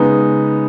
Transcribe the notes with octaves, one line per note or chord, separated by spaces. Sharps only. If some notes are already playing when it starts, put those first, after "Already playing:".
Already playing: C#3 G#3 B3 D#4